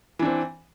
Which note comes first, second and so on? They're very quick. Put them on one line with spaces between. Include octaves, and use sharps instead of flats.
E3 D4 C4